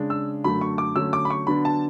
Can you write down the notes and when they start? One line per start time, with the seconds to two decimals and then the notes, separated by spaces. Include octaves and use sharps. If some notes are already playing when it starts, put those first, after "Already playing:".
Already playing: C#3 G#3 D4
0.10 E6
0.44 F#2 D3 F#3 A3 B5
0.61 C#6
0.78 D6
0.95 D3 F#3 A3 C#4 E6
1.13 D6
1.25 B5
1.30 C#6
1.47 D3 F#3 B3 D4 B5
1.65 A5